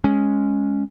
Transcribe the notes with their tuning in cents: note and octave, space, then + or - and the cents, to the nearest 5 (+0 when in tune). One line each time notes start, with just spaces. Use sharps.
G#3 +0 C#4 +0